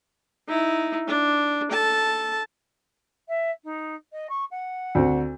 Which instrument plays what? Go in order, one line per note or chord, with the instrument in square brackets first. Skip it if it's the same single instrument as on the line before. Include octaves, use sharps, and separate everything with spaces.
[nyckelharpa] D#4 E4
D4
A4 A5
[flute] E5
D#4
D#5
C#6
F#5
[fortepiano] D2 C4